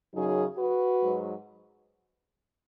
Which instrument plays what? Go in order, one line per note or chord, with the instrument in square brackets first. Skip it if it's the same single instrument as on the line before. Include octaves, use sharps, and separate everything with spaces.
[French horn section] F#2 C#3 F#3 D#4 G#4
F#4 B4
G#2 F#3